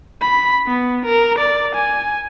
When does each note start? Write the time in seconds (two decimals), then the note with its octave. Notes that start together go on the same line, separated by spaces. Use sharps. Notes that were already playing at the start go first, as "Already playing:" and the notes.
0.22 B5
0.67 B3
1.06 A#4
1.38 D5
1.75 G#5